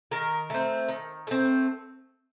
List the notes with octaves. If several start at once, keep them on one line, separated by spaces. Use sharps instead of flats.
D#3 A#4
A3 C4
D#3
A3 C4